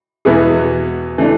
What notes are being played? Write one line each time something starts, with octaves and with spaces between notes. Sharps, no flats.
E2 B2 B3 E4 G#4
E3 A3 D4